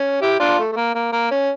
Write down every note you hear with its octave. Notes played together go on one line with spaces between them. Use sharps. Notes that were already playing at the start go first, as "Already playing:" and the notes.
Already playing: C#4
E4 G4
D4 F4
A3
A3
A#3
A#3
A#3
C#4